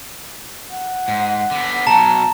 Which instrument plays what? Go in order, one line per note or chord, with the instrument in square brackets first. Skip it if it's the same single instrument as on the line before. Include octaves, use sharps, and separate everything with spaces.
[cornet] F#5
[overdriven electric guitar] G#2
D3 B3
[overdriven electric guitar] B2 F#3 [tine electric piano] A5 [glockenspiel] A#5